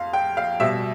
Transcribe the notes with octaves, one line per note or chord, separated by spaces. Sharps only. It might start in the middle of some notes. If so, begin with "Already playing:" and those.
Already playing: F2 F5 C6
G5
F5
B2 G3 E5